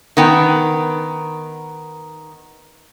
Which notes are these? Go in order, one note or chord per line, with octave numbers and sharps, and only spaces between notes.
D#3 B3 G5